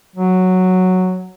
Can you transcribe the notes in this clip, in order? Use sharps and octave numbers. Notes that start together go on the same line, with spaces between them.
F#3